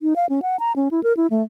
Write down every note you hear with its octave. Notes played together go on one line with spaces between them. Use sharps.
D#4
F5
C#4
F#5
A#5
C#4
E4
A#4
E4
A3